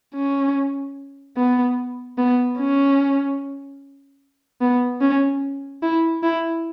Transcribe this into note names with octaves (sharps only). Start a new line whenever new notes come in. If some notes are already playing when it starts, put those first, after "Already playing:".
C#4
B3
B3
C#4
B3
C#4
E4
E4